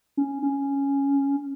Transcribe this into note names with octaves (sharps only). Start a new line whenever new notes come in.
C#4
C#4